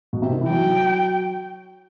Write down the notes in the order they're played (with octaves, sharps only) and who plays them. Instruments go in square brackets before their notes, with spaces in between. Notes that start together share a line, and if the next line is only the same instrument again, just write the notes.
[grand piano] B2
C3
D#3
E3
[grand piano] F#3 [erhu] G5